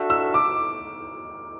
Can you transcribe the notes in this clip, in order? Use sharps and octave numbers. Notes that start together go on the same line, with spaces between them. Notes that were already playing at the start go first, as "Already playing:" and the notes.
Already playing: D4 F#4 A4 E5
E6
D6